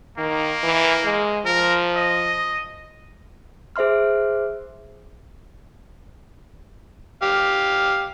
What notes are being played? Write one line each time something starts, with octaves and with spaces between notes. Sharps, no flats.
D#3 A#3
E3
G#3
F3 A#4
D#5
G#4 C5 E5 C6 F6
G4 F5